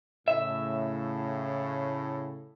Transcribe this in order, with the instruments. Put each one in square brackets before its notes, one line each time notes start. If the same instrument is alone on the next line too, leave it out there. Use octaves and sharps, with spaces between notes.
[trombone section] A2 C#3 [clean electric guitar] E5